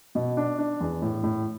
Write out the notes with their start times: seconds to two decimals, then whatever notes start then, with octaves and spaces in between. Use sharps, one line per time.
0.15 B2
0.37 D4
0.59 D4
0.80 E2
1.02 A2
1.23 A2